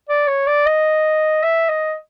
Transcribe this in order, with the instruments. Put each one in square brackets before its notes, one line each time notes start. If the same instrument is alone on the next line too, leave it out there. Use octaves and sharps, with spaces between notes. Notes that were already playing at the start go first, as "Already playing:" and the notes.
[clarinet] D5
C#5
D5
D#5
E5
D#5